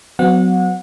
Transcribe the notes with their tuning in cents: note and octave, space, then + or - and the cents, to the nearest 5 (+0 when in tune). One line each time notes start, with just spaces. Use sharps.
F#3 +0 B3 +40 F#5 -30